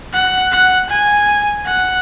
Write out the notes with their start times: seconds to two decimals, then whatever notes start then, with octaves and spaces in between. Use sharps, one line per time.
0.13 F#5
0.52 F#5
0.90 G#5
1.66 F#5